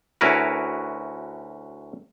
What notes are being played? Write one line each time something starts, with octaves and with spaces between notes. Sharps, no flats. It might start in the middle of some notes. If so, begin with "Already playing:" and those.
D2 C#4 E4 F#4 A#4 B4